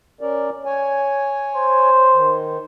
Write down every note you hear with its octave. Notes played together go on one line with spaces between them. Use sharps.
C#4 A#4 D5
C#5 G#5
C5
D#3